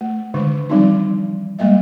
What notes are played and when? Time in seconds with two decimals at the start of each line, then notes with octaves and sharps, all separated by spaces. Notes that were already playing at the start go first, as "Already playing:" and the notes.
0.01 A3
0.34 D3 D#3 G#3 D4
0.70 E3 F3 G3 C4 D4 D#4
1.59 G3 G#3 A#3 D#5 E5